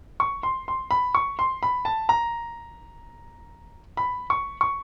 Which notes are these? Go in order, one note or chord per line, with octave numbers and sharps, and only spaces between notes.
C#6
C6
C6
B5
C#6
C6
B5
A5
A#5
B5
C#6
C#6